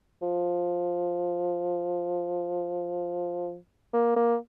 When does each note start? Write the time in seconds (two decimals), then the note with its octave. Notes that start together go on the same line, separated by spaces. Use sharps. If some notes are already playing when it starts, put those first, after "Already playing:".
0.22 F3
3.93 A#3
4.16 A#3